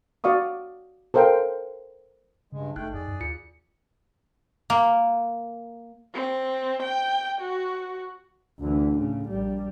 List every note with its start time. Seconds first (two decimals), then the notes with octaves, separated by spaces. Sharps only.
0.24 F#4 D5 F5 C#6 D#6
1.14 A4 A#4 C5 F5 G5
2.52 G2 C#3 G#3
2.76 G1 A3 D#4 G5 F#6
2.94 F2 G#4 D5
3.08 F#2
3.20 D#2 F4 C#7
4.70 A#3
6.14 C4
6.83 G5
7.41 F#4
8.60 D2 E3
8.97 A2 C#3
9.28 A#1 G3